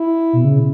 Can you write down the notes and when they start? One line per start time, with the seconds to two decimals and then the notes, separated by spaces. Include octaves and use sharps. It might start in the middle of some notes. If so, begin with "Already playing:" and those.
Already playing: E4
0.33 B2
0.45 C#3